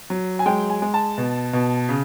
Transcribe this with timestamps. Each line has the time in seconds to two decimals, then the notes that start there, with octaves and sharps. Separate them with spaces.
0.10 F#3
0.39 G#5
0.46 G#3 G5
0.70 G#5
0.82 G#3
0.94 A5
1.18 B2
1.53 B2
1.89 C#3